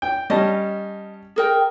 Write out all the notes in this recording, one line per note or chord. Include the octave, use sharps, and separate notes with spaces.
G5
G3 C#4 D#5 A5
G#4 A#4 G5